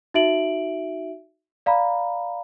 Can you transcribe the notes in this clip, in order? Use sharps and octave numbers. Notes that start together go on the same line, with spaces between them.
D#4 F#4 E5 D7 F#7
D5 F5 A#5 B5